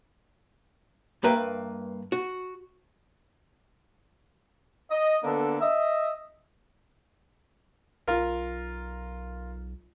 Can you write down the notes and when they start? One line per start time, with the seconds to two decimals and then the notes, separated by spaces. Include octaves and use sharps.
1.23 G2 A#3 B4 E5 G5
2.12 F#4
4.90 D#5
5.23 D3 A#3 B3 D4 A4
5.61 D#5 E5
8.08 B1 F4 A#4